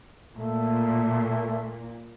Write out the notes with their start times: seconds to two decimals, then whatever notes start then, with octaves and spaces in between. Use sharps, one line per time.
0.38 A#2 A3